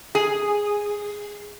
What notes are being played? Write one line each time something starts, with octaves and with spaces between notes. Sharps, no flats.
G#4